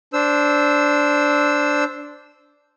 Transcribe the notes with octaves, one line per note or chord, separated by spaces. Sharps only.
D4 C5 E6